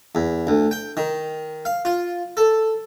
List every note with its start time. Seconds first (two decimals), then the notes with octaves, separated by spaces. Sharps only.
0.15 E2
0.47 D2
0.71 G5
0.97 D#3
1.65 F5
1.85 F4
2.37 A4